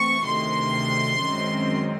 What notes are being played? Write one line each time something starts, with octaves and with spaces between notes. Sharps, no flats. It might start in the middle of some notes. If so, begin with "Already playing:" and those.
Already playing: E3 A3 C4 C#6
D2 C3 D#3 C6
F#2 D#3 G#3 C4